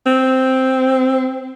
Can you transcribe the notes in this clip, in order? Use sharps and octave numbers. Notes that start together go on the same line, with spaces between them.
C4